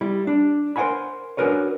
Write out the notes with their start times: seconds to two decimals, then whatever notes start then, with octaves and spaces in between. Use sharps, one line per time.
0.01 G3 E4
0.27 D4
0.76 A#4 C5 C#5 F#5 G#5 B5
1.37 C#4 D4 F#4 A#4 B4 C#5